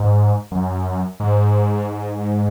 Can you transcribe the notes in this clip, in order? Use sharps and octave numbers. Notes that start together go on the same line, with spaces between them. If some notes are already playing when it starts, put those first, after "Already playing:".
Already playing: G#2
F#2
G#2